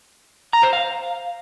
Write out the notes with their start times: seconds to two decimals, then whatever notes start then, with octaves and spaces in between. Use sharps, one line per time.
0.53 A#5
0.63 C5
0.73 F5